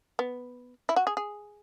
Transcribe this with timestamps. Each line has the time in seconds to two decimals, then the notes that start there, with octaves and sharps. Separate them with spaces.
0.19 B3
0.89 E4
0.96 F#4
1.07 G#4
1.17 G#4